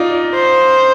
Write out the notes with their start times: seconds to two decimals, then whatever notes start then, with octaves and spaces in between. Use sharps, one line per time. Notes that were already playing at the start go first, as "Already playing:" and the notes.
Already playing: D#4 F4 D5
0.34 C5